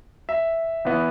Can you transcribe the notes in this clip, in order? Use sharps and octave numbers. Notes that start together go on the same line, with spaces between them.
E5
E2 E3 B3